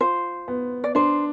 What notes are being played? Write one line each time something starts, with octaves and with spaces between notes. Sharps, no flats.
F4 C5
B3
D5
D4 C5